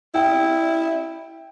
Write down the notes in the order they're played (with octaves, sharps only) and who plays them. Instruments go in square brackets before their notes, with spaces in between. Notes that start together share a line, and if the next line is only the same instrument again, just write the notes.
[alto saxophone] E4 [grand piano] G5